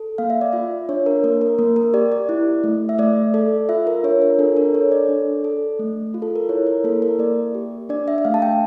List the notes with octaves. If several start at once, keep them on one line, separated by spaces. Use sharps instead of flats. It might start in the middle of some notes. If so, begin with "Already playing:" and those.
Already playing: A4
A#3 F5
E5
D5
F4 E5
D4 C#5
A#4
A#3 A#4
A#4
A#3 A#4
A#4
G4 D5
D5
E4
A3
E5
A3 D5
A4 D5
F4 E5
A#4
D4 C#5
A#4
D4 A4
A#4
A4 C#5
D5
D4
A4
A3
F4
A4
A#4
E4 C#5
A#4
A#3 A4
A#4
A#3 D5
G4
D4 D5
E5
E5
A3 F5
A5
G5